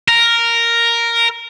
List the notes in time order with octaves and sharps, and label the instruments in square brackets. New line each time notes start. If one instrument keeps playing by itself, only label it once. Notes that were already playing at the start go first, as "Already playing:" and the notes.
[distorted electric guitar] A#4